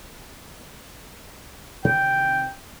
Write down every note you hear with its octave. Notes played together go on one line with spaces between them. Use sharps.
C3 D#3 E3 G5